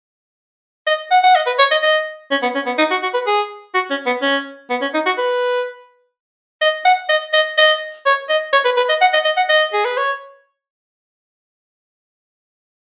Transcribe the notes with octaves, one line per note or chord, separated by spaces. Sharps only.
D#5
F#5
F#5
D#5
B4
C#5
D#5
D#5
C#4
B3
C#4
B3
D#4
F#4
F#4
B4
G#4
F#4
C#4
B3
C#4
B3
C#4
D#4
F#4
B4
D#5
F#5
D#5
D#5
D#5
C#5
D#5
C#5
B4
B4
D#5
F#5
D#5
D#5
F#5
D#5
G#4
B4
C#5